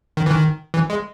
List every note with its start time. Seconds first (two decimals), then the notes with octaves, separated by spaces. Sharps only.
0.17 D#3
0.26 E3
0.31 D#3
0.74 E3
0.90 G#3